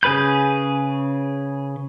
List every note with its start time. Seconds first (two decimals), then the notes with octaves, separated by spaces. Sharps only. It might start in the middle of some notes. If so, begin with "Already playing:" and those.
0.03 C#3 G#4 B4 B5 G6